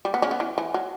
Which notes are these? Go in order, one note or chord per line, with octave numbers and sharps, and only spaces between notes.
G3
B3
C#3 C#4
B3
E3
E3
F#3